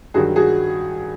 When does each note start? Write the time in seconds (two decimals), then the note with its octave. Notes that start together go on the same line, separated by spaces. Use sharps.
0.14 G2 D#3 F#3 F#4 G#4
0.36 F#4 G#4